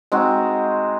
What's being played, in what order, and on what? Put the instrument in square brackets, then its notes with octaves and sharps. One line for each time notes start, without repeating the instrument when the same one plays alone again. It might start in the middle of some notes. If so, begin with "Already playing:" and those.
[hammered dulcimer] G#3 C4 D#4 F#4